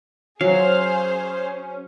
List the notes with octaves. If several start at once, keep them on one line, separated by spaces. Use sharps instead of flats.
F#3 C#4 G#4 C5 F5